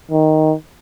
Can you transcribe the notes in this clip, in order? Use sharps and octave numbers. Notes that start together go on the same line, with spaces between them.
D#3